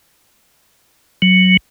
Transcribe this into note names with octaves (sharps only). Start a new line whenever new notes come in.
F#3